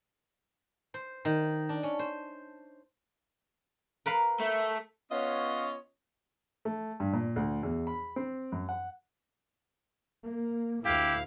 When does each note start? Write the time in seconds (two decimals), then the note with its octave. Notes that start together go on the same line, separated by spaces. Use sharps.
0.94 C5
1.25 D#3
1.69 D4
1.83 C#4
1.99 C5
4.06 A#4 B4 F5
4.40 A3
5.11 B3 C#4 F4 C#5 D#5
6.65 A3
7.00 G2
7.13 A#2
7.36 D2
7.63 E2
7.87 B5
8.16 C4
8.52 F#2
8.69 F#5
10.23 A#3
10.85 D2 E4 G4 F5